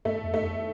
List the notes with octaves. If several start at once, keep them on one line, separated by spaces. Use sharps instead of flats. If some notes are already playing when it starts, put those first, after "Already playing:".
G2 A3
F2
A3
F2